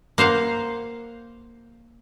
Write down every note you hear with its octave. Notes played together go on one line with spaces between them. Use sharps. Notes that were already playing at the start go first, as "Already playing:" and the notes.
A#3 C5 F5 F#5